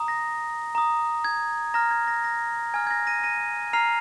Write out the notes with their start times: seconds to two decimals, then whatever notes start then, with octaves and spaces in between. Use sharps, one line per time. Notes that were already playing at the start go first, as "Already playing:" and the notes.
Already playing: A#5 D#6
0.08 A#6
0.75 A#5 D#6
1.24 G#6
1.74 A#5 F6 A#6
1.91 G#6
2.07 A#6
2.24 A#6
2.74 G#5 F6 G#6
2.87 G#6
2.91 A#6
3.07 A#6 D#7
3.24 A#6 D#7
3.73 A#5 F6 C7 F7